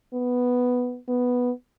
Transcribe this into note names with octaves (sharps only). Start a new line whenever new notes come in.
B3
B3